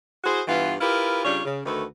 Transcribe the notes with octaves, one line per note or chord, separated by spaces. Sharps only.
E4 F#4 G#4 C5
G2 E3 B3 F4
E4 F4 G4 A#4 B4
C#3 G3 D4 F4 C#5
C#3
D2 D#3 A3 F#4 B4